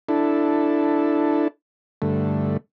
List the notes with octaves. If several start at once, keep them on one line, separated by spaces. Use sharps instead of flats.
D4 E4 A4
G2 D3 A3